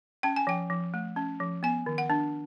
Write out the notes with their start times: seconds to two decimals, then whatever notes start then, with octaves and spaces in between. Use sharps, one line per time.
0.23 C#4 G5
0.36 G#5
0.47 F3 G5
0.70 F3
0.94 A3
1.16 C#4
1.40 F3
1.63 B3 G#5
1.86 D#3
1.98 F#5
2.10 D4